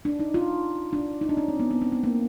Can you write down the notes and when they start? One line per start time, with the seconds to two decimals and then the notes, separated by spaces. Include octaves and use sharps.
0.05 D4
0.20 D#4
0.34 F4
0.93 D4
1.21 D#4
1.29 D4
1.37 C#4
1.48 C4
1.60 B3
1.71 B3
1.81 C4
1.92 B3
2.04 A#3